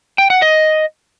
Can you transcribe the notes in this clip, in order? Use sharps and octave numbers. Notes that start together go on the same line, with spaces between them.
G5
F#5
D#5